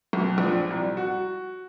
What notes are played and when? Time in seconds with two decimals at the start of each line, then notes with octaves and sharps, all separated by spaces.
0.13 B1
0.38 A#1
0.70 C2
0.97 F#4